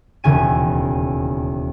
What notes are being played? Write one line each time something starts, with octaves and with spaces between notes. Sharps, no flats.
E1 D#2 C#3 G#5 D#7